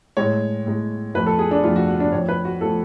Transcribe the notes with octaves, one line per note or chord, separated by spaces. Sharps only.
A2 G#3 C#5
A2 G#3
F2 F3 A3 B4
A4
G#4
D4
F2 F3 A3 F4
F#4
F#4
D4
F2 F3 A3 C#5
B4
F#4
F3 A3 A4